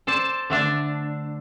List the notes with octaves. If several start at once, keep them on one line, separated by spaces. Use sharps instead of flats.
A4 C5 D5 A5
D3 A3 D4